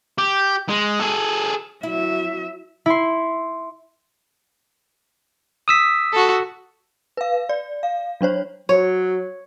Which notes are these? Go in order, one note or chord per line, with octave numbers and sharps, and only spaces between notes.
G4
G#3
G#4 A4
F#3 E4 E5
E4 C6
D#6 E6 B6
F#4 A4
B4 F5
D5
F5
F#3 D4 C5 C#5
F#3 C#5